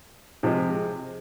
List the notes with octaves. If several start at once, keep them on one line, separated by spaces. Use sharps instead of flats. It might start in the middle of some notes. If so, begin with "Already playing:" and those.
C3 F3 G#3